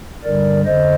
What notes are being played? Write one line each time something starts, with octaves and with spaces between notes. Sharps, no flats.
G2 D3 G3 A#4 D5
F2 D3 C5 D#5